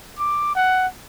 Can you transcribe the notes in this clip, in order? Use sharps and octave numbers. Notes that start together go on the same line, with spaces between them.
D6
F#5